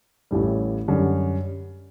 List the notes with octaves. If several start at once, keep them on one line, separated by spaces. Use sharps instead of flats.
A1 A2 G3
F#2 D3 G3